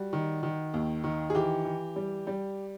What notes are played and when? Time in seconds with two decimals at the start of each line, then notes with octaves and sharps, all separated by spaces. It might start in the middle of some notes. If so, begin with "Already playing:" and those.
Already playing: G3 F#4
0.13 D#3
0.43 D#3
0.74 D#2
1.04 D#3
1.30 G#4
1.35 E3 G4
1.65 E3
1.96 G3
2.27 G3